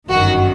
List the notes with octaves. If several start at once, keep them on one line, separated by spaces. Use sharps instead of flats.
G1 F#2 D#3 F#4